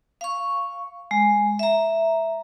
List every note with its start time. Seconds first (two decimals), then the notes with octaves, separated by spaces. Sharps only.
0.21 F5 C#6
1.11 G#3
1.59 E5 A#5